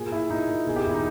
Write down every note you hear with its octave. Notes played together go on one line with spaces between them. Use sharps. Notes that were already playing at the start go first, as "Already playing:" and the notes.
Already playing: A#2 G#4
A#2 E4
A#2 D#4
A#2
B2 G#4
G4
E2 E4
D#4